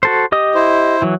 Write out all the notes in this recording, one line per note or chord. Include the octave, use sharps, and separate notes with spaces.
F#4 A4 C5
G4 D#5 D#6
E4 C5
E3 F#3